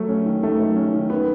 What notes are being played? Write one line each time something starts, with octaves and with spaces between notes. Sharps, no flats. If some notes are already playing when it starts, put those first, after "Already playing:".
Already playing: F#3 A3
C#4
D#3
A3
F#3
C#4
D#3
B3